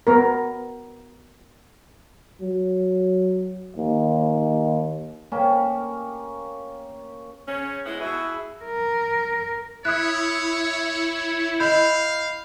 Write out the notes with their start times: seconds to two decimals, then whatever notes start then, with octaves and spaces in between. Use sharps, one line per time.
0.07 B3 A#4
2.41 F#3
3.77 D#2
5.32 A#3 C#4 G4
7.47 C#3 C#4
7.86 G#3 B3 E4
8.00 B2 E4 F#4 G#4
8.65 A#4
9.85 E4 C#5 D#6 F#6
11.60 D#5 F5 B5 G6